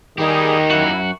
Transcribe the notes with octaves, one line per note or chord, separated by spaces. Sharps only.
D#3 G3 D#4 G4 G#4
F#2 E4 F#4